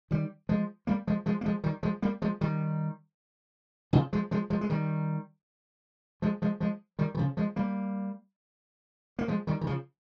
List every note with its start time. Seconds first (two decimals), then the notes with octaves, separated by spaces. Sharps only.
0.11 D#3 G3
0.49 F3 G#3
0.87 G3 A#3
1.07 F3 G#3
1.26 F3 G#3
1.41 A#3
1.46 F3 G#3
1.64 D#3 G3
1.83 F3 G#3
2.02 G3 A#3
2.22 F3 G#3
2.41 D#3 G3
3.93 C#3 F3
4.13 F3 G#3
4.31 F3 G#3
4.50 F3 G#3
4.61 G#3
4.70 D#3 G3
6.22 F3 G#3
6.42 F3 G#3
6.60 F3 G#3
6.99 D#3 G3
7.15 D#3
7.18 C#3 F3
7.37 F3 G#3
7.56 G3 A#3
9.19 A#3
9.28 F3 G#3
9.47 D#3 G3
9.61 D#3
9.67 C#3 F3